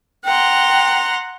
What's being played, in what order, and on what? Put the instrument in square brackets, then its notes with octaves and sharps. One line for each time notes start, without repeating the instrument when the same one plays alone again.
[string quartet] F#5 A#5 C6 [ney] G5